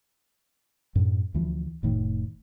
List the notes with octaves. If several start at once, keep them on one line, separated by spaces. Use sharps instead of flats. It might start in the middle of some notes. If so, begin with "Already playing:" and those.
F#2 A2
D2 E3 F3
F1 A2 D#3